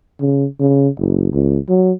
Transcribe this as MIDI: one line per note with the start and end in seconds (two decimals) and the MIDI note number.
0.20 0.46 49
0.60 0.89 49
0.99 1.29 30
1.33 1.58 37
1.69 1.92 54